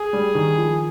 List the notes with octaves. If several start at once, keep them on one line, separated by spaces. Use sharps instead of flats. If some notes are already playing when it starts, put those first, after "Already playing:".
Already playing: G#4
G3
D#3
F3